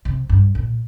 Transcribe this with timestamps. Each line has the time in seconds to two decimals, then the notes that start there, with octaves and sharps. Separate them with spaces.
0.05 C3
0.29 G2
0.55 A#2